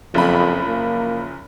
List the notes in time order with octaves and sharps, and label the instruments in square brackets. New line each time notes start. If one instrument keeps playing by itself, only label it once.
[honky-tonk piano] F#1 F3 B5 [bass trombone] F2
[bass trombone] A#3